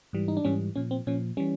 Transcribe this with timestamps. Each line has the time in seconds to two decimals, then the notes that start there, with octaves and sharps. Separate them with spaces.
0.13 G#2 E3 G3
0.28 D#4
0.37 D4
0.44 G#2 E3 G3 C#4
0.75 A#2 F3 C#4
0.91 C4
1.07 A#2 F3 C#4
1.37 E3 G3 C#4